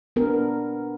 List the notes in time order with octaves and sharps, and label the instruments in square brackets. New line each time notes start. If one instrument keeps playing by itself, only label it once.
[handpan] B3 D4 A#4